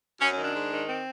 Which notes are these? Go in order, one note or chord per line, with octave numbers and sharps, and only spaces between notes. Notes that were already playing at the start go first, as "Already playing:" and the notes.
F#2 C#4
D#3 C#4
D4
G#2
D#3
C4